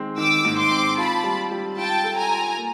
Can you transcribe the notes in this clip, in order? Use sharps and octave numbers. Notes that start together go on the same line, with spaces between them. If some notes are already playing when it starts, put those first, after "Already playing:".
Already playing: D#3 G#3 C4
D#3 D6 E6
G#2
C6 D6
C4
F4 A5 B5
G3
G3
F4 G5 A5
A4
G#5 A#5
F4
A#3